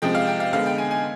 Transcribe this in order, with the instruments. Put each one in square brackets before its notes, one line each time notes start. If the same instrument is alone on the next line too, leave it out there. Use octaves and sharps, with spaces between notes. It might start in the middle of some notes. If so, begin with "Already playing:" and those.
[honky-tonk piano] C3 F3 G#3 G5
F5
G5
F5
D3 G#3 B3 F5
G5
G#5
G#5